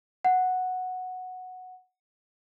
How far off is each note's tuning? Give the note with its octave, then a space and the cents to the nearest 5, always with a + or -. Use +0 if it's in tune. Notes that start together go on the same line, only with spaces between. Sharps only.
F#5 -5